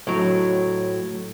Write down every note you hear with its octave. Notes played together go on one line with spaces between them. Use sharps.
A2 F#3